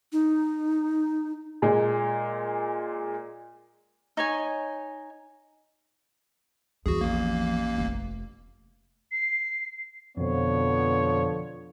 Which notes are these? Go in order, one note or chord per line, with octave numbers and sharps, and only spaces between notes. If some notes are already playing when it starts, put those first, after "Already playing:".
D#4
A#2 G#3
D#4 C#5 G#5
E2 F3 F#4 G#4
A1 A#3
F1
C7
F2 B2 D3 F3 B3 C#5